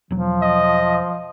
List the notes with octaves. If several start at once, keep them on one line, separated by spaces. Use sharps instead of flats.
E1 F3 F#3
D#5